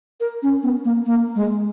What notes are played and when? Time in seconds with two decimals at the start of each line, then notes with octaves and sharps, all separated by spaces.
0.20 A#4
0.43 C#4
0.63 B3
0.85 A#3
1.06 A#3
1.35 G#3